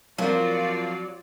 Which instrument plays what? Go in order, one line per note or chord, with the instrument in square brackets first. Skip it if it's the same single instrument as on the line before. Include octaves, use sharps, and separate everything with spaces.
[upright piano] F3 A#3 C4 [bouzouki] F#3 [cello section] F4 F#4 D5